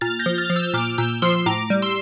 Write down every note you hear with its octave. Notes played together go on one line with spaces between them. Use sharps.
A#2 F6 A6
G6 A#6
F3
F6 A6
F3
E6 G6
A#2 D6 F6
A#2 E6 G6
F3 C6 E6
A2 A#5 D6
G3
C6 E6